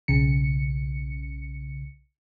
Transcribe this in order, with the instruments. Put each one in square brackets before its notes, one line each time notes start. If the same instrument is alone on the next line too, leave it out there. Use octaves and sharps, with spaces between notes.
[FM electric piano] B1 C#3 C#7